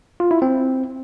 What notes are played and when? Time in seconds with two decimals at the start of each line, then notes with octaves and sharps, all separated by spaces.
0.20 F4
0.31 E4
0.42 C4